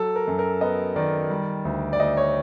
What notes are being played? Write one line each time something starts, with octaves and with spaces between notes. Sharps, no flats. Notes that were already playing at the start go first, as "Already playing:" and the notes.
Already playing: F#3 A4
A#4
F#2
A#4
B3 D#5
D#3 D5
G3
D2
D5
D2 D#5
C#5